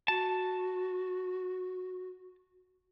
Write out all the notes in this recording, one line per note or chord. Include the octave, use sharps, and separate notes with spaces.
F#4 A5